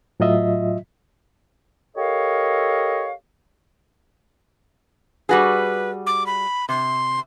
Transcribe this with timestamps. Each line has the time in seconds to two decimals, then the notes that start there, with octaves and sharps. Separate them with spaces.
0.20 A2 F#3 F4 D#5 E5
1.97 G4 A4 A#4 C#5 D#5 F5
5.29 G3 F#4 G#4 B4
6.07 D6
6.26 B5
6.69 C3 C6